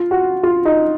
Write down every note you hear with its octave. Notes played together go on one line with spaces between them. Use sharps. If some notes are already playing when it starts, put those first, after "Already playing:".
Already playing: F4
F#4
F4
D#4